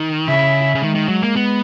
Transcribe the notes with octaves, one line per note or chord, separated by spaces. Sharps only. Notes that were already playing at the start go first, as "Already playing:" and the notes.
Already playing: D#3
C#3 E4
C#3
D#3 G#3
D#3
F#3
A#3
B3